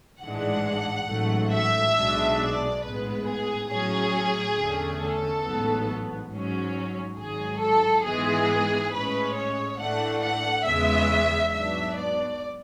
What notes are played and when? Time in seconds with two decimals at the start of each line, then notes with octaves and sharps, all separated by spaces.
0.22 A1 G#2 E3 G#3 D4 F#5
1.09 A1 G#2 F#3 A3
1.53 E5
1.96 B1 B2 G#3 D4
2.39 D5
2.83 A1 G#2 G#3 B3 B4
3.26 G#4
3.70 A2 F#3 C#4 G#4
4.57 E2 D3 A3 C#4
5.01 A4
5.44 A1 G#2 F#3 B3
6.31 G#2 F#3 C#4
7.18 G#1 G#2 F#3 G#4
7.61 A4
8.04 G#2 E3 G#3 B3 G#4
8.92 A2 G#3 C#4 B4
9.35 C#5
9.78 A2 E3 A3 D4 F#5
10.22 F#5
10.65 E2 C#3 G#3 B3 E5
11.52 G#2 F#3 B3 D4 E5
11.96 D5